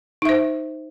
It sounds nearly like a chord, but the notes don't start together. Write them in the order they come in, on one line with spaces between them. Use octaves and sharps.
D#4 E5 C5